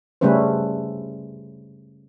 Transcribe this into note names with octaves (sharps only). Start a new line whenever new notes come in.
C#3 G3 A3 C#4 B4 C5